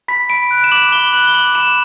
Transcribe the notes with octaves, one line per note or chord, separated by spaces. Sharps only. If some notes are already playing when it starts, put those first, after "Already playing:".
B5 B6
B5 D7
F#6
E7
D6 F#7
B5 G7
F#6 F#7
G7
D6 F#7
B5 E7